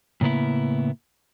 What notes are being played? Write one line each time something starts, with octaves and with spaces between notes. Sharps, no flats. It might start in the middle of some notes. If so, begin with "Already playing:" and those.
A2 C#3 A#3 B3 E4